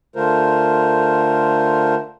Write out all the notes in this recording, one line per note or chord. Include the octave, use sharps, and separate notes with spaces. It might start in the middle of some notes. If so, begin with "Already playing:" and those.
D3 A3 F4 A#4 C5